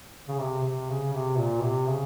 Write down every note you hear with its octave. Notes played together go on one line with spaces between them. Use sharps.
C#3
C3
C3
C#3
C3
A#2
C3
C#3